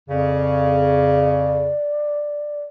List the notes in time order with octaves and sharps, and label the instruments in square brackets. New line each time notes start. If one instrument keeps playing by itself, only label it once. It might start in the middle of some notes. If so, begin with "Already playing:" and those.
[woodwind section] F2 C#3 [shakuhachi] D5